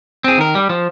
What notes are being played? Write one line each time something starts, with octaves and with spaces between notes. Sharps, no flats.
C4 G#4
D#3 A#4
G3
F3